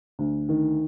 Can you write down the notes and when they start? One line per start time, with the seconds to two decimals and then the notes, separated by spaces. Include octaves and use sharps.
0.19 D2
0.49 D#3